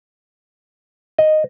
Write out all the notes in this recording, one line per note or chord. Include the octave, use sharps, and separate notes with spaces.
D#5